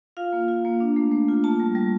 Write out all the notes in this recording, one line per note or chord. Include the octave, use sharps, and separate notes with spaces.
F4 F5
A#3
F4
A#3
D4
A3
A3
F4
A#3 A5
G3
G3